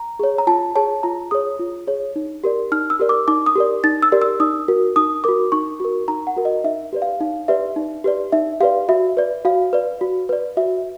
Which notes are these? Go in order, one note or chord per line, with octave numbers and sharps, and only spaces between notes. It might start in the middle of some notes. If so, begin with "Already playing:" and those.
Already playing: A#5
G#4 C#5
A#5
F4 A5
G#4 C#5 A5
F4 A#5
G#4 C#5 D#6
F4
G#4 C#5
D#4
G4 A#4 D5
D#4 F6
E6
G4 A#4 D5
D6
D#4 D6
D#6
G4 A#4 D5
D#4 A6
E6
G4 A#4 D5
E6
D#4 D#6
F#4 A#4
D#4 D#6
F#4 A#4 D6
D#4 C#6
F#4 A#4
D#4 A#5
F#5
F#4 A#4
D#5
D#4 E5
G4 B4 D5
F5
D#4 F5
G4 B4 D5 E5
D#4
G4 B4 D5
D#4 E5
G4 B4 D5 F5
F#4 E5
B4 D5
F#4 F5
B4 D5
F#4
B4 D5
F#4 E5